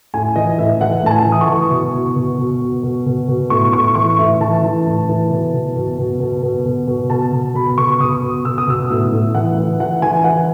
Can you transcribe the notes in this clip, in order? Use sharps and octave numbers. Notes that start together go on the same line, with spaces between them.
A2 G#5
E3 D#5
A2 E5
E3 F#5
A2 A5
G#5
E3
D#6
C#6
E3
B2
B2
B2
B2
B2
B2
B2
B2
A2 C#6
A2 C#6
E3 C#6
A2 E5
E3 A5
E3
A2
E3
B2
B2
B2
B2
B2
B2
B2
B2
B2 A5
B2
B2 B5
B2 C#6
C#6
B2 D#6
B2
B2 E6
D#6
B2 E6
A2 E6
A2
E3 F#5
E3
E3 F#5
E3 G#5
E3 F#5